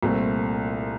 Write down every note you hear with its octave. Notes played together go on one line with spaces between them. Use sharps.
C2 A#2 A3 C4